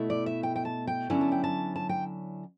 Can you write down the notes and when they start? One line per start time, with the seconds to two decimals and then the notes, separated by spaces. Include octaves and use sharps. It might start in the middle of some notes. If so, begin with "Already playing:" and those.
Already playing: B2 A3 E4
0.10 D5
0.26 E5
0.43 G5
0.56 G5
0.65 A5
0.87 G5
1.10 D3 F#3 C#4 E4
1.21 A5
1.32 G5
1.44 A5
1.76 A5
1.89 G5